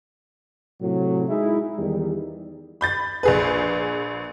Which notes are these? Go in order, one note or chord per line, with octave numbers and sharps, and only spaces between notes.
A2 C3 F#3
G#3 D#4 E4
E2 D#3 G3
B5 G6 A6
A#1 G#4 B4